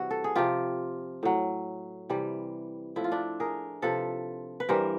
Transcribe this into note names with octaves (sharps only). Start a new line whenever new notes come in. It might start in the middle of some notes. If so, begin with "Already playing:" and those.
Already playing: C3 E3 G3 E4 F#4
A4
G#4
C3 F3 F4 G4
A2 F#3
C3 E3 G3
A2 F3 E4
F4
D4 E4
G#4 A#4
C3 F3 A4 B4
B4
G2 E3 G3 A#4 C5